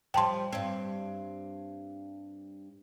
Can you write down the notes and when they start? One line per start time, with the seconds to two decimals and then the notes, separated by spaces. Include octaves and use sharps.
0.14 F3 G3 G5 A5 C6
0.52 G2 C4